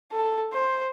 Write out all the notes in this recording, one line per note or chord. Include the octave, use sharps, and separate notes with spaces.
A4
C5